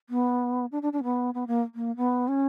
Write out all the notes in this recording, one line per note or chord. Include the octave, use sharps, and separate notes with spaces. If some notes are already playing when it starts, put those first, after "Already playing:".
B3
D4
D4
D4
C#4
B3
B3
A#3
A#3
B3
C#4